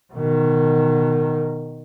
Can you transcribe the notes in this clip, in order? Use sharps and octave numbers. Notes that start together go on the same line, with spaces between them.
B2 D#3